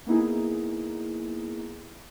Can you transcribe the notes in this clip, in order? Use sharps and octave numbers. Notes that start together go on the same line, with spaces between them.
A#3 B3 D#4 E4 G#4